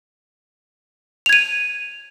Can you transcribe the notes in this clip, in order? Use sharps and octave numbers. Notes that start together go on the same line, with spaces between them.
G#6 D#7 F7